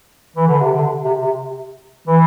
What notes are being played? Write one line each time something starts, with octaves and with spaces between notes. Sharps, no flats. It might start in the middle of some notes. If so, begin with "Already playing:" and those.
E3
D3
C3
D3
C3
C3
E3